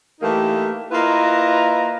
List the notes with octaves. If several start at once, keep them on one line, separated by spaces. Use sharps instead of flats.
E3 A3 A#3 D#4 G4
A#3 E4 F4 B4 D#5 A#5